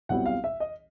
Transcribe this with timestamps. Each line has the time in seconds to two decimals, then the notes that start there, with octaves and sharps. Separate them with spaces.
0.09 B1 B2 G3 C4 E4 F#5
0.26 F5
0.44 E5
0.60 D#5